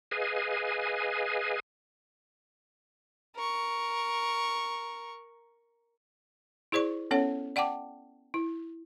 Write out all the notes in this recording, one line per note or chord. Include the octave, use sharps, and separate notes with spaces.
G#4 B4 D#5 F5 G#5
A#4 C#6
E4 G#4 C5 D5 C#6
B3 C#4 A4 C#5 F#5
D5 F#5 G5 A5 D6
E4